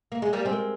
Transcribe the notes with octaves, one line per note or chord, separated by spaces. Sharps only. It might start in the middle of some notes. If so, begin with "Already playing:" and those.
A#3
G#3
G3 A#3
G#3 C4 C5
A#4